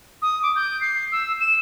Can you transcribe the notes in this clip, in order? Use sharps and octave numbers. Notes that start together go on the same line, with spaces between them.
D#6
D6
G6
C7
E6
E7